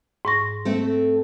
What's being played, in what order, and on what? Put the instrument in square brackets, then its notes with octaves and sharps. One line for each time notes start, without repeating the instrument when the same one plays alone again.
[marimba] G#2 C#6 A#6
[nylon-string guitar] A3 C4 A4